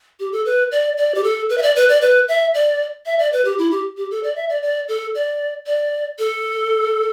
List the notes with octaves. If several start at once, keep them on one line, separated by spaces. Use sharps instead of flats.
G4
A4
B4
D5
D5
G4
A4
B4
E5
D5
B4
D5
B4
E5
D5
E5
D5
B4
G4
E4
G4
G4
A4
D5
E5
D5
D5
A4
D5
D5
A4